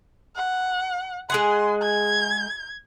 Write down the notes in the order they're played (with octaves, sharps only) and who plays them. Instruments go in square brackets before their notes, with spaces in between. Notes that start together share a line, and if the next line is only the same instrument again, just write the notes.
[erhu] F#5
[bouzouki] G#3 G#4 F#5 [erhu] C6
[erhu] G#6